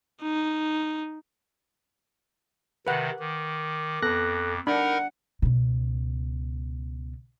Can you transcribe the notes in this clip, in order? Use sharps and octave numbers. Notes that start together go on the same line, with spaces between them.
D#4
C3 D#3 B4 F#5
D#3 D6
F2 B3 A4 F#6 A#6
D4 D#4 A#4 F#5 B5
C#2 B2